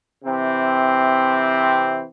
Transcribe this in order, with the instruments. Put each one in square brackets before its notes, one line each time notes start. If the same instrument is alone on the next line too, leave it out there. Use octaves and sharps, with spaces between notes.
[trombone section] C3 E3 C4